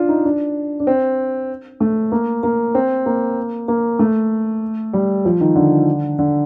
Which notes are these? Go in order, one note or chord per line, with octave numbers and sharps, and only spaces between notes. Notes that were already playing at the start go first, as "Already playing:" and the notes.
Already playing: D4 F4
D#4
D4
D4
C4
A3
A#3
A#3
C4
A#3
A#3
A3
G3
F3
D#3
D3
D3